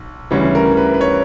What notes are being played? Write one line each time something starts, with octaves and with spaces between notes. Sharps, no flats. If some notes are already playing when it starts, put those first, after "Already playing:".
Already playing: B1
D2 C#3 E3 G3 C#5
A#4
B4
B4
C#5